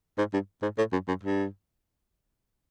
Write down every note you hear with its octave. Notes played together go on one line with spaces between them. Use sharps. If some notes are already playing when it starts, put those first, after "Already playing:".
G#2
G2
G#2
A2
F#2
F#2
G2